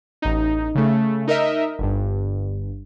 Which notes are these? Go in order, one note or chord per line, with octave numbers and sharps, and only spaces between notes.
A1 D#4
C#3 A3
D#4 A#4 D#5 E5
G1 G2